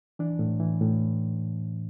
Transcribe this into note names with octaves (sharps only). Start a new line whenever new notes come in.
E3 D4
A2
E3
A2